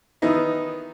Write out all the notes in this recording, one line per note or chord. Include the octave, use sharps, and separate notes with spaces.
D#3 E3 B3 D#4 E4